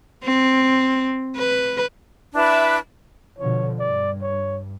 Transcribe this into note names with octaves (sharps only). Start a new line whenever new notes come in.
C4
B4
D4 E4 B4 E5
B2 D3 F3 C#5
G2 D5
C#5